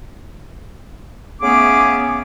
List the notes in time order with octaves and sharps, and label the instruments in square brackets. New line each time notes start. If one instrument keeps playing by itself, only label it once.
[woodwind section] C#3 A3 B3 C#4 G#4 D6